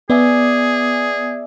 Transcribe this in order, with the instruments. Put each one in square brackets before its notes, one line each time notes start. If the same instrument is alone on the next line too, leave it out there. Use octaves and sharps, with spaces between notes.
[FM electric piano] B3 [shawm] G#4 [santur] D5 E5 G#5